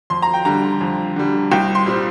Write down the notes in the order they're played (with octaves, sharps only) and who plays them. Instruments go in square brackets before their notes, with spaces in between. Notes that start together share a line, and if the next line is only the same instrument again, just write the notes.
[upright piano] F2 C6
A#5
G5
D3 G3 A#5
F2
D3 G3
C2 G5
C6
A#2 G3 C4